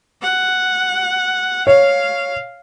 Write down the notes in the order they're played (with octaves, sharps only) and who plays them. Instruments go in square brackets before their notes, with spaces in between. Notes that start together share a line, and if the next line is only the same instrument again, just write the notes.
[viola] F#5
[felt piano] C#5 [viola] F5